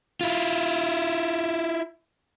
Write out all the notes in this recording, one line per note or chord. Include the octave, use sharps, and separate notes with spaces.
E4 F4